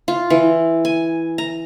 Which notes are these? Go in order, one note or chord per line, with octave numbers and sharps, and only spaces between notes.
F4
E3
G#5
A#5